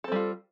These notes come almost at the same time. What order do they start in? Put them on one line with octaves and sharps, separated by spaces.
A4 C4 G3 F4